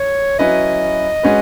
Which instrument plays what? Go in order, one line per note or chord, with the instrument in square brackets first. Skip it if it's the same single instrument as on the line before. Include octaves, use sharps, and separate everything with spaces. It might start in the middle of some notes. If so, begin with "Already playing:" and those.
Already playing: [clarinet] C#5
[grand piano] F#3 C#4 E4 B4 [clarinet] D#5
[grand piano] G#3 C#4 F#4 B4